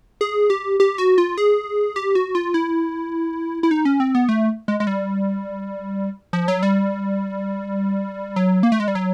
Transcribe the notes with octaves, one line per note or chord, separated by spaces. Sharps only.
G#4
G4
G4
F#4
F4
G#4
G4
F#4
F4
E4
E4
D#4
C#4
C4
B3
A3
G#3
G#3
G3
F3
F#3
G3
F#3
A#3
A3
G#3
G3
F#3